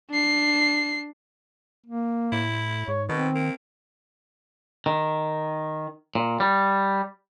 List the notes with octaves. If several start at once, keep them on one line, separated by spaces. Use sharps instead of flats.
D4 C7
A#3
A2 E4
G#2 C#5
B2 D#3 C4
A#3
D#3
A#2
G3